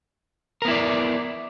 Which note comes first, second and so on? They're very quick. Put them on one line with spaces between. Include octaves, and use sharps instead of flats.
A#4 B3 E4 D5